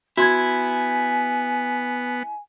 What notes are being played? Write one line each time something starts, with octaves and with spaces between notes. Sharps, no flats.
B3 E4 F#4 G#5 C6 G#6